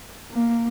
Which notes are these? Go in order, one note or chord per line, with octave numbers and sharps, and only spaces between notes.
A#3